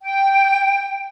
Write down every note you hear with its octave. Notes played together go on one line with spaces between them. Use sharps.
G5